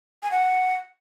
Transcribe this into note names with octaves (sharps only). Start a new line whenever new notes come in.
G#5
F#5